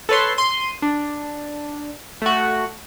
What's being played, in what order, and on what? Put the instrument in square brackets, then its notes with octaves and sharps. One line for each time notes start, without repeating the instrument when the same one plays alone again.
[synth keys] A4 B4 C#5 C6
C6 D#7
D4
A3 F#4